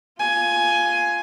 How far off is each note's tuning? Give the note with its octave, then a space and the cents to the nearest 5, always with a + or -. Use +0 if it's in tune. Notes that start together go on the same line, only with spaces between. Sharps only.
F4 +0 G#5 +10